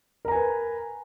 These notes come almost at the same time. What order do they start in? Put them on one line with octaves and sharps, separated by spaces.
A#4 A#5 G#5 B4